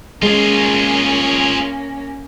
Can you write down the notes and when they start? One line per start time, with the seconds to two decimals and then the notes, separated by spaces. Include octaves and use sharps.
0.23 G#3 A#3 C#4 F4 G#4